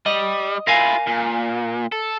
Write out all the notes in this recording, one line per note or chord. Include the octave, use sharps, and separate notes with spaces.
G3 D#5
E4 F4 A#4 F5 G#5
A#2
A4